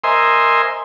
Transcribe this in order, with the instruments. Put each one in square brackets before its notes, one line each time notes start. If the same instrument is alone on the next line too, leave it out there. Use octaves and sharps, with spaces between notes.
[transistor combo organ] A#4 C5 D#5 E5 G#5 C6